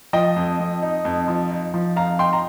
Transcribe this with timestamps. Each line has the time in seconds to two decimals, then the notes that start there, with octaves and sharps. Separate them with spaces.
0.13 F3 D#5 G5
0.36 F2
0.59 F2
0.82 D#4
1.05 F2
1.28 F3
1.51 D#4
1.74 F3
1.96 F2 F5 A#5
2.19 D#4 G5 C6
2.33 A#5